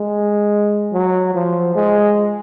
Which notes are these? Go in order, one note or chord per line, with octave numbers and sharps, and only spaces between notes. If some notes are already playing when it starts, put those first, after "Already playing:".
Already playing: G#3
F#3
F3
G#3